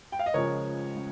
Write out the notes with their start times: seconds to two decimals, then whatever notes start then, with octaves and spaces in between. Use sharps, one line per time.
0.12 G5
0.19 F5
0.26 D#5
0.34 C#2 C#3 F3 G#3 A#4 C#5
0.96 C#3